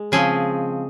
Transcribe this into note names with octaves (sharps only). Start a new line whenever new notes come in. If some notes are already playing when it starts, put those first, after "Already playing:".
Already playing: G#3
C#3 F3 C4 G#4